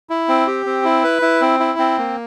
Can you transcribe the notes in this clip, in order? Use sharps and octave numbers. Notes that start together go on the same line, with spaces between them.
E4
C4
G4
C4
E4
B4
E4
C4
E4
C4
A#3